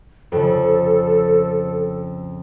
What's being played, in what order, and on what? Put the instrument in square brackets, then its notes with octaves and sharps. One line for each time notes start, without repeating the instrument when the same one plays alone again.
[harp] F2 C#3 [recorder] A4